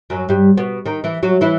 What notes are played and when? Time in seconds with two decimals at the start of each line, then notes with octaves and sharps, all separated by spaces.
0.10 F#2 F#3
0.29 G2 G3
0.57 B2 B3
0.86 D#3 D#4
1.04 E3 E4
1.23 F#3 F#4
1.41 E3 E4